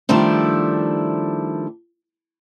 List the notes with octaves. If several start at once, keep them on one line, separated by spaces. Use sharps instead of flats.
D#3 F3 G3 A3 D4 E4